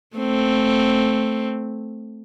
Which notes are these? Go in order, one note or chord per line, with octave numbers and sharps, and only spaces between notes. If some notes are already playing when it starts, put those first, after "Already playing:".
A3 C4